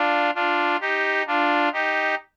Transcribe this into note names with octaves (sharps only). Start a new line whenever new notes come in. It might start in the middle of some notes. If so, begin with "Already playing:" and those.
Already playing: D4 F4
D4 F4
D#4 G4
D4 F4
D#4 G4